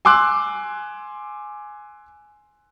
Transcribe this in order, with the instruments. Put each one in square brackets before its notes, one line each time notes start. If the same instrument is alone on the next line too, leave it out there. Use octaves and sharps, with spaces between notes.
[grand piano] G#5 C6 D6 E6 F#6